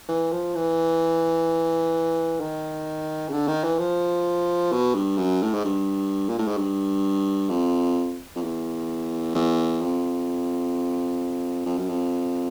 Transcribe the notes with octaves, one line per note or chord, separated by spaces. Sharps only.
E3
F3
E3
D#3
C#3
D3
D#3
E3
F3
B2
G2
F#2
A2
G#2
G2
A#2
A2
G#2
G2
F2
F2
E2
E2
F2
F2
F#2
F2